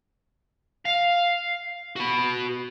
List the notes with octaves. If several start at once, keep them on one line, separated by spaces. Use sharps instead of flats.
F5
F#4 B5